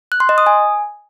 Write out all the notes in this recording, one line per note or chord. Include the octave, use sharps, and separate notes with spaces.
F#6
C6
D#5
D#6
G#5